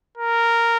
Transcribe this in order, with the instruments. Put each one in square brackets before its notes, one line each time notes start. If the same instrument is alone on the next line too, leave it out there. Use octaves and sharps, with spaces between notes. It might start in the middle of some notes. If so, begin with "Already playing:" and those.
[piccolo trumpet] A#4